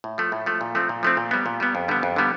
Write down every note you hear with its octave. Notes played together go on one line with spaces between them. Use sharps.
A2
F3 A3
A2
F3 A3
A#2
F3 A3 C4
A#2
F3 A3 C4
A#2
G3 B3
A#2
G3 B3
F2
D3 G3 B3
F2
D3 G3 B3